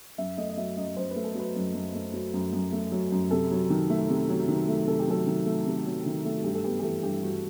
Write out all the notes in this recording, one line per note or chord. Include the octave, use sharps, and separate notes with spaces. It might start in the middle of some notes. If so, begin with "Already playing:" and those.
F#2 E5
A3 D#5
D#5
F#3 E5
F#2 D#5
F#2 C5
B4
A3
A4
F#3 B4
F#2
F#2
A3
F#3
F#2
F#2
A3
F#3
F#2
C3 A4
F#3
D#3
A3
C3
F#3
D#3
A3
C3 A4
G4
F#3 A4
D#3
A3
C3
F#3
D#3
A3
F#4
G2 G4
A4
B3 G4
G4
E3 A4
G2 G4
G2 F#4